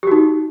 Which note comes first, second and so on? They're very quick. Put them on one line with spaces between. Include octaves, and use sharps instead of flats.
G4 F#4 D#4